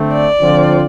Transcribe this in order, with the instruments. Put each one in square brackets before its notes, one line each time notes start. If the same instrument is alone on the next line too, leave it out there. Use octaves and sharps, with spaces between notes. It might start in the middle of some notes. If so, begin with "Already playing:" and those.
Already playing: [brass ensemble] D3 A3 C4
[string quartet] D5
[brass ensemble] D3 F3 C4 F4